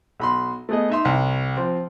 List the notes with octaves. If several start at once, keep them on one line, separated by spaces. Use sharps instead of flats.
B1 B5 C6
A3 B3 G#4 D#5
D#4 E5 C6
C2
F3 C4